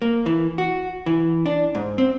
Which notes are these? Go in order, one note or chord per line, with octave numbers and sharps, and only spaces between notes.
A#3
E3
F#4
E3
D4
G#2
C4